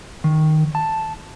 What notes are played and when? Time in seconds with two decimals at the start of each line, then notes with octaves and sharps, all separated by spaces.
0.24 D#3
0.75 A5